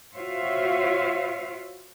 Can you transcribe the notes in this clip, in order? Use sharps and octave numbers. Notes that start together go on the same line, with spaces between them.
F4 F#4 C5 C#5 E5 F5